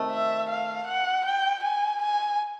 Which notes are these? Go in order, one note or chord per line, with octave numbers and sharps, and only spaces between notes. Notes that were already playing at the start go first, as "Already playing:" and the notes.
Already playing: C3 D#3 A3
E5
F5
F#5
G5
G#5
G#5